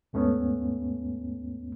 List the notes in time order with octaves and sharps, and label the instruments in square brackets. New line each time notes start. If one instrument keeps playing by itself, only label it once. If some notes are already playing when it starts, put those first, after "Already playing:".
[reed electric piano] D#2 G#2 A3 B3 C#4